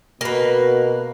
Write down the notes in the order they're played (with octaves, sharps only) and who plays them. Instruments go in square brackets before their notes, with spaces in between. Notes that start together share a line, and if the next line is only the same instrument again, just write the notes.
[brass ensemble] B2 [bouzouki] A#3 B4